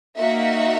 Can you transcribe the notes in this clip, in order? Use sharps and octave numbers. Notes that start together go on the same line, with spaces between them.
A#3 D#4 F#4 E5